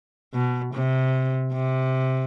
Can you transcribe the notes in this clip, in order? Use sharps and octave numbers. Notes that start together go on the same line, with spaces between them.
B2
C3
C3